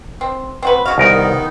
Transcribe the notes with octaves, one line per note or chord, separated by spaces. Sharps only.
C4
C4 F#4 B4
C#3 F#4 F5
C2 D#3 B3 D#4 A#4